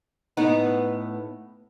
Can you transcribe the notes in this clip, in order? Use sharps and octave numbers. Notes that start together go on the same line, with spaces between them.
A2 B3 D#4